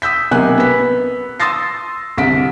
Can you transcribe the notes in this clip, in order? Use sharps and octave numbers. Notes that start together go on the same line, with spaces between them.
D#6 E6 G6 B6
B1 C3 A#3 G#5 F#6
B3 B6
C6 D#6 E6 A6 A#6 C7
C2 D3 B6 D7